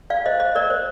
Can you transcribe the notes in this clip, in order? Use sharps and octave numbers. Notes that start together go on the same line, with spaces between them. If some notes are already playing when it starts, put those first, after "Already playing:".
D5 F5
C5 D#5
C5 D#5
A#4 D5
C5